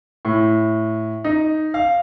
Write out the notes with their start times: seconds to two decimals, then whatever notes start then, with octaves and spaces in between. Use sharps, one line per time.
0.25 A2
1.24 D#4
1.74 F5